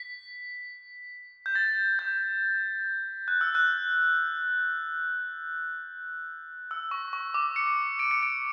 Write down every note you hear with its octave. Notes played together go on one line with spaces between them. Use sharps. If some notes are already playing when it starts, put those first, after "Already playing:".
Already playing: B6
G6
A6
G6
F#6
E6
F#6
E6
C#6
C#6
D6
C#7
D7
C#7
D7